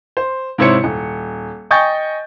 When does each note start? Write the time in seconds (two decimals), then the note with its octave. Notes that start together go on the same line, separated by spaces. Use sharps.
0.17 C5
0.58 G#2 C3 E4 C5 C#5 C#7
0.84 D#1
1.71 D#5 G5 G#5 C#6 G6 A6